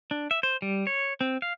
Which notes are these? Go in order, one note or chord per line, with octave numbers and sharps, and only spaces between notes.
D4
E5
C5
G3
C#5
C4
F5